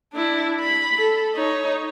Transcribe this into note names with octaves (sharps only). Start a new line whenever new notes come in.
D4 E4
B5
A4
D#4 C#5